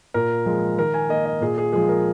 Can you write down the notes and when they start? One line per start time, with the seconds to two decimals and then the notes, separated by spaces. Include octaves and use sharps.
0.14 A#2 A#4
0.46 F3 G#3
0.78 D#3 A#4
0.94 G#5
1.09 A#3 D#5
1.26 D#5
1.41 A#2 G#4
1.58 G#4
1.73 F3 G#3 G#4
1.89 A#4